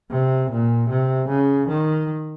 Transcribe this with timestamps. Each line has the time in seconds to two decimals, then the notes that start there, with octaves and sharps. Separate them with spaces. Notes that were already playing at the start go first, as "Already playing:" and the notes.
0.11 C3
0.51 A#2
0.90 C3
1.28 C#3
1.68 D#3